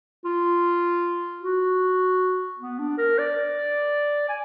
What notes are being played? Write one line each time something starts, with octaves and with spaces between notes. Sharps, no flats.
F4
F#4
B3
D4
A#4
D5
G#5